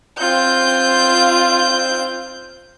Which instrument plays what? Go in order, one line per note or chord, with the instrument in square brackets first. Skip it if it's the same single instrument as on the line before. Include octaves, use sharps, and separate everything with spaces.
[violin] C4 G6 [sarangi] F4